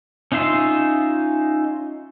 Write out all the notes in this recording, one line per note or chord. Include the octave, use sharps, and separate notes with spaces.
C#4 D#4 F4 E5 C6